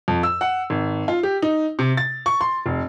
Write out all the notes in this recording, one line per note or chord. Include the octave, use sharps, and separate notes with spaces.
F2
E6
F#5
G#1
F4
G4
D#4
C3
A6
C#6
C6
F1